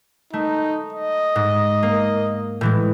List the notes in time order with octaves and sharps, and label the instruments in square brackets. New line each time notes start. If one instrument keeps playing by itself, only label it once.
[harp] A3 [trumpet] D#4
[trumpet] D#5
[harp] G#2
A#3
A2 E3 G#3